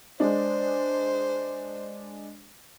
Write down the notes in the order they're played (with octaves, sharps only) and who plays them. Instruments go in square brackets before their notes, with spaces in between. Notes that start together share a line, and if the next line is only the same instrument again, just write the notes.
[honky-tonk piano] G#3 D4 [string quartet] C5